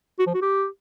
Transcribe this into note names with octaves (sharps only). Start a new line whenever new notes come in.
F#4
F3
F#4
G4